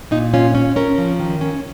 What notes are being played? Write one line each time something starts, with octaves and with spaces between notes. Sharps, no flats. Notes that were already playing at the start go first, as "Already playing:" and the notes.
A#2 D#4
C#4 F4
C#4
C#4 A#4
F3
D#3
C#4